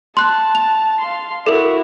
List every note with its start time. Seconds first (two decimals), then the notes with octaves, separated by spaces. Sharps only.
0.17 A5 C6 F#6
0.55 F7
1.00 F5 C6
1.46 E4 F#4 A4 A#4